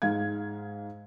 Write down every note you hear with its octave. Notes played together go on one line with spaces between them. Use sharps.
G#2 G#3 F5 G#6